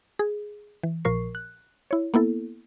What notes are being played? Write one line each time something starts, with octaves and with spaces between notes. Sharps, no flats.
G#4
E3
A#1 A#2 F3 A#4 C#6 C7
F#6
E4 C#5
A#3 B3 E4 A4